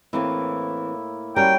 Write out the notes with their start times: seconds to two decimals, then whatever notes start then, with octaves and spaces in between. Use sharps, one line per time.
0.13 A2 E3 A#3 C4 E4
1.36 G3 C#4 F#4 A#4 C#5 G5